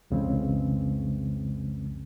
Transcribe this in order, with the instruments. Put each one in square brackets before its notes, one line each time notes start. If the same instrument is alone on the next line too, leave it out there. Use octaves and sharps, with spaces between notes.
[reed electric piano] C2 F2 C#3 E3 G#3 C4